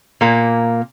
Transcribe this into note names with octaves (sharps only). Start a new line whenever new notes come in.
A#2 A#3